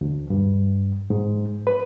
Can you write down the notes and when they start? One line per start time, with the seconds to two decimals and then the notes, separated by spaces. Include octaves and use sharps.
0.01 D2
0.30 G2
1.10 G#2
1.67 B4